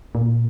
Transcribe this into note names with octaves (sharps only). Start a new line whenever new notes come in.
A#2